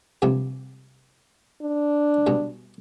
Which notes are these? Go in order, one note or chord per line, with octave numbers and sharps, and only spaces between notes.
G2 C3 F3
D4
G2 B2